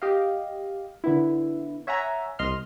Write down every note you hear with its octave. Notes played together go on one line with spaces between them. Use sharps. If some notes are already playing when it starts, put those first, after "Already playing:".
G4 D#5 F5
D3 B3 E4
C#5 E5 F#5 G#5 A#5
C2 D#5 C6 F6